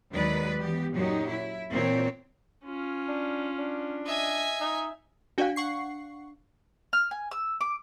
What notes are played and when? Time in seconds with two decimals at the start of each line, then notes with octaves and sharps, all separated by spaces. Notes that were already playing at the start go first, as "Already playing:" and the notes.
0.12 D#2 D#3 F#3 G#3 B4 D5
0.58 E3 B3 G4
0.93 F#2 A#2 F#3 D#4 G4
1.29 E4
1.71 A#2 E3 C4 C#5
2.64 C#4 F4
3.08 D4
3.58 D4
4.06 D#5 E5 G#5
4.61 D#4
5.38 D4 F#4 D5 F5 G5 G#5
5.56 F#5 C#6 C7
6.93 F6
7.11 G#5
7.31 E6
7.61 D6